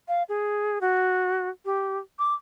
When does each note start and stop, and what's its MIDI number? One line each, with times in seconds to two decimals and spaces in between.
0.08 0.23 77
0.29 0.78 68
0.81 1.49 66
1.65 1.98 67
2.19 2.34 86